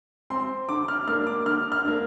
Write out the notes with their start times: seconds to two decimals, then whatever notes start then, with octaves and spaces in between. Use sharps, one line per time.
0.30 C4 C6
0.69 D3 D6
0.88 F6
1.08 A#3 D4 F6
1.27 D6
1.46 D3 F6
1.72 F6
1.85 A#3 D4